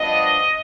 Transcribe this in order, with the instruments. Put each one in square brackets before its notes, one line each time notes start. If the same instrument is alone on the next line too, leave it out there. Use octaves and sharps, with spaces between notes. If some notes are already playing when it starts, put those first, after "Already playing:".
Already playing: [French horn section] G2 F3 B3 D4 D#5